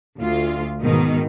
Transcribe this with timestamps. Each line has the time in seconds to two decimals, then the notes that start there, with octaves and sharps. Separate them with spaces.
0.19 D2 F4
0.81 G#2 B2 D#3 D#4